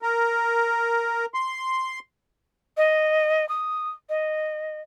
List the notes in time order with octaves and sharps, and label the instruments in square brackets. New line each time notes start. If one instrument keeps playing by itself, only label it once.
[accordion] A#4
C6
[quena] D#5
D#6
D#5